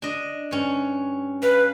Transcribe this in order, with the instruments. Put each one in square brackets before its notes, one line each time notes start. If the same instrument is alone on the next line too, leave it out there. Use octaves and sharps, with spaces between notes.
[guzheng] D4 D#5
G2 C#4
[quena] B4 [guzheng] F5